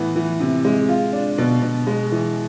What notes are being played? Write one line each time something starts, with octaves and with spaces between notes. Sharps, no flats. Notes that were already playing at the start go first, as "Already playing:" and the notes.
Already playing: A2 E3 B3
E3
C3
G#3
F4
D4
B2
B2
G#3
E3